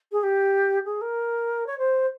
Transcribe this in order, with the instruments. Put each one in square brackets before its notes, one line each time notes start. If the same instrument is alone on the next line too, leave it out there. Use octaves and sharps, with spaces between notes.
[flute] G#4
G4
G#4
A#4
C#5
C5